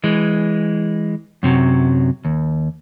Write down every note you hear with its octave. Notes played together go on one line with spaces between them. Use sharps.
E3 G#3
F#2 C3 D#3 F#3
D#2